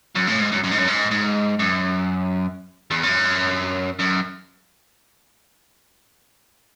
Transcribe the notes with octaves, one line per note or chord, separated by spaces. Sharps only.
F#2
A2
G#2
F#2
F#2
G#2
F#2
G#2
G#2
F#2
E2
F#2
F#2